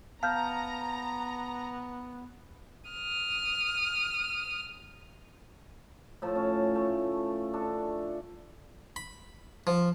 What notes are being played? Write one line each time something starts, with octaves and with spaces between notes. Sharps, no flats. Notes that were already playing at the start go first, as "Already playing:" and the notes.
B3 F5 A5 A#5 F6 G6
D#6 F6
A2 F3 A5
C#4
A3
D4 A4
B5
F3